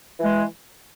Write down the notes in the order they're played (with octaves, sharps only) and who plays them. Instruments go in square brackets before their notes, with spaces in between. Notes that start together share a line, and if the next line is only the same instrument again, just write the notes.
[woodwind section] E3 G#3